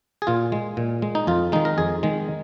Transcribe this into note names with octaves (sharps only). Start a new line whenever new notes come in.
G#4
A#2 F4
G#3
A#2
G#3
D#4
F2 F4
D#3 G#3 D#4
A#4
F2 G#4
D#3 G#3